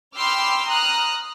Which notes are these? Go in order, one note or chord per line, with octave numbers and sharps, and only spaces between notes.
G5 B5 C6 D6 E6 F6
A#5 D#6 F6 F#6